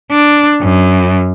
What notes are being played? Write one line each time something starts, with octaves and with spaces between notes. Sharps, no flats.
D4
F#2